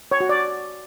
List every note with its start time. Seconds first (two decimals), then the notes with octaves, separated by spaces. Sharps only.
0.11 C#5
0.20 F#4
0.29 D5